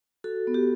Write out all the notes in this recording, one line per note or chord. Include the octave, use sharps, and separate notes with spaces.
F#4 A4
B3
G4